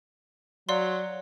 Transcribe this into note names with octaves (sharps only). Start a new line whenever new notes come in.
F#3 D5 F5 C6